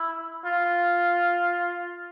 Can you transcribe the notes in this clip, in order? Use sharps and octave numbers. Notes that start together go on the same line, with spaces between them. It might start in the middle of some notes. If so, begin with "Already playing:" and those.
Already playing: E4
F4